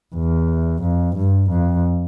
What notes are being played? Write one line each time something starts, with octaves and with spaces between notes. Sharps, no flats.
E2
F2
G2
F2